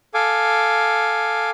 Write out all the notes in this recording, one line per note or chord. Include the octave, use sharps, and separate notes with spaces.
A4 F5 G#5 D6